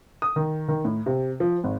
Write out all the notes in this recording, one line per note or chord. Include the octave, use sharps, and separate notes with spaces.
D#6
D#3
D#3
A2
C3
F3
G#1